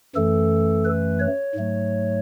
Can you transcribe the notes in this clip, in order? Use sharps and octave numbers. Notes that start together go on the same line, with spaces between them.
F#2 E3 A3 A4
B4
C#5
G#2 F#3 A3